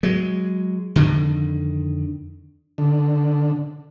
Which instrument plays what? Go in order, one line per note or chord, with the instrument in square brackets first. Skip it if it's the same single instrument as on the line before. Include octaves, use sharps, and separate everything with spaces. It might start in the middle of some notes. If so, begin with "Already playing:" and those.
[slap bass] F#3 G#3
F2 D3 D#3
[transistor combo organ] D3